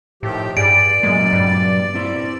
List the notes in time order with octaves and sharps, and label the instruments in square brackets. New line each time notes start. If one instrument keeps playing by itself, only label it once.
[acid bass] A2 [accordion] D#3 F3 G4
[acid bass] G2 [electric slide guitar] G#4 [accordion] D5 [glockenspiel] D7
[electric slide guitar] A#2 F#3 A#3 [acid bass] G#3
[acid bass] G2
[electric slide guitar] C4 E4 C5